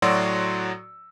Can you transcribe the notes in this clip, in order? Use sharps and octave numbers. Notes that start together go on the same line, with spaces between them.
A2 F#3 F#4 D5 C6 E6